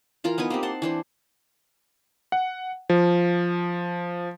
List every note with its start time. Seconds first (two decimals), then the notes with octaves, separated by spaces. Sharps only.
0.24 E3 F4 A#4 A#5
0.38 B3 D#4 B4 G#5
0.50 A#3 C4 G4
0.63 F#5 A5 C6
0.82 E3 D4 C5
2.32 F#5
2.89 F3